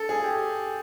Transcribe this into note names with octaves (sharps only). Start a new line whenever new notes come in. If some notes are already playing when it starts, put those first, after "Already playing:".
Already playing: A4
G#4
G4